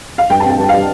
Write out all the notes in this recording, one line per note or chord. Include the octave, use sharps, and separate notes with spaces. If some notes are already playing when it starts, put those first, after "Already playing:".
F5
G2 G5
A5
C4 G5
G2
F5
G3